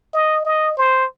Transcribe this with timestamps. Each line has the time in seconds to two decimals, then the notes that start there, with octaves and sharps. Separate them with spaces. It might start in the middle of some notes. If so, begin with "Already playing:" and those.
0.13 D#5
0.45 D#5
0.77 C5